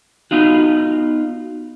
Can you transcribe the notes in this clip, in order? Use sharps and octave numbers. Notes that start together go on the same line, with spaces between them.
B3 D#4 F4 F#4